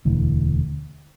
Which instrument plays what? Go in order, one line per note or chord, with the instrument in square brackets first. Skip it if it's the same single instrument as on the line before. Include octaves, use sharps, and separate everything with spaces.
[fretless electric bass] E1 D2 D3 E3